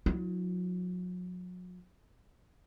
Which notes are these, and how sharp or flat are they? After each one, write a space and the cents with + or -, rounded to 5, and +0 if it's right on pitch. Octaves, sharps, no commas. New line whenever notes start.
F#3 -40 E4 -20